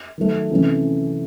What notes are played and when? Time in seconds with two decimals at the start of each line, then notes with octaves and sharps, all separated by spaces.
0.18 D#3 F#3 A3
0.51 C3 E3 A3 C#4